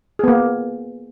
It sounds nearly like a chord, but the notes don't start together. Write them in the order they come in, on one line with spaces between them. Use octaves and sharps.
G#4 B3 A#3